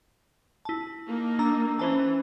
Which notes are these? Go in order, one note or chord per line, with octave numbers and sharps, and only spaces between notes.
E4 A5
A#3 D#4
D4 A#5 E6
E3 C#4 C5 A5